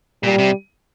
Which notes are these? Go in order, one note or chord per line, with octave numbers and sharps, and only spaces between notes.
A#2 G3
C3